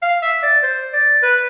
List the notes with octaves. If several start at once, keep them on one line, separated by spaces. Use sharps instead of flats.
F5
E5
D5
C5
D5
B4